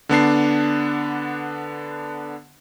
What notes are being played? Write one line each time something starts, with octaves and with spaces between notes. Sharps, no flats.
D3 B3 D4 C7